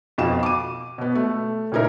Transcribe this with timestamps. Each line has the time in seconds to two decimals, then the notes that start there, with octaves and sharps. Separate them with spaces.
0.18 F2 B2 F4 E7
0.43 D6 D#7
0.98 B2 B3
1.15 A3
1.72 A#2 C#3 D#4 E4 A#4